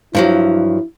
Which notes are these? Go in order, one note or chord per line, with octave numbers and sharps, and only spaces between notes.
G2 F3 F#3 E4